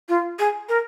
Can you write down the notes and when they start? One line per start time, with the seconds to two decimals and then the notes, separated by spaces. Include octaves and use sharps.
0.09 F4
0.39 G#4
0.69 A#4